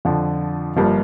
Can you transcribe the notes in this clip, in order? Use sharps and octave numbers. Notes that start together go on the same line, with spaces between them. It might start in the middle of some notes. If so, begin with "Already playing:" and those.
F2 D3 F3
G1 G2 F3 A#3